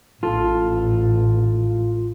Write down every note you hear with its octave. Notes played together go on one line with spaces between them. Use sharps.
A1 F4 A4